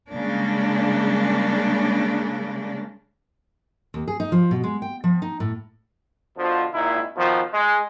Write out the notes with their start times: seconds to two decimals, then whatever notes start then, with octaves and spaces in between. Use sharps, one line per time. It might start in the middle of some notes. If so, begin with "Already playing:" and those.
0.10 C#3 G3 G#3 A#3 D4
3.94 D#2
4.08 G#4
4.20 D#4
4.32 F3
4.51 B2
4.63 G#3
4.82 G5
5.04 F3
5.22 D#4
5.40 A2
6.38 B2 D3 F3
6.73 G#1 A#2 D#4 E4
7.16 B2 D#3 F3
7.53 G#3